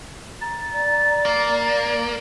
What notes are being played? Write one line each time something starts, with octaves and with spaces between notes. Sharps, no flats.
A#5 A6
D5 A6
A#3